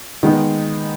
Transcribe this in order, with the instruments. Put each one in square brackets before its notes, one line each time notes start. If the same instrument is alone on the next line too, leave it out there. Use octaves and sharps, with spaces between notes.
[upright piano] D#3 G#3 B3 D#4